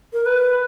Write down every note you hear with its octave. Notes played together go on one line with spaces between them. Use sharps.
A#4
B4